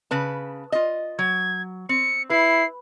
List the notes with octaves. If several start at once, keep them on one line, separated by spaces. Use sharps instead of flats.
C#3 B4 A5
F4 D#5
F#3 G#6
C4 C#7
E4 B4 C7